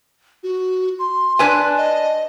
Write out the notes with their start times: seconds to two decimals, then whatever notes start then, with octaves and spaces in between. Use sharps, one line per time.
0.43 F#4
0.99 C6
1.39 D4 B4 G#5
1.77 D#5